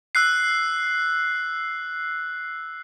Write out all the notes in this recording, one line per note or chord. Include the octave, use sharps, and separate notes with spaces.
E6 F#6 C7